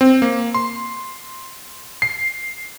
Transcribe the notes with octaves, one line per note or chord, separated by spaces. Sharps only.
C4
A#3
C6
C7